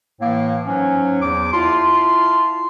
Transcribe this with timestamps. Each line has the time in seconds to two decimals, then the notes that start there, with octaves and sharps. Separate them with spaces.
0.21 A2 E3 A#3
0.66 G#2 F#3 C#4
1.21 E2 D6
1.53 E4 F4 A5 C6